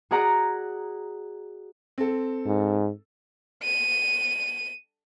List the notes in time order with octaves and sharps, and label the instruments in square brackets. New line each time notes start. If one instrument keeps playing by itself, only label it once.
[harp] F#4 G#4 D5 F#5 A#5 D6
[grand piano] C4 A4
[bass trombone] G#2
[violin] D#7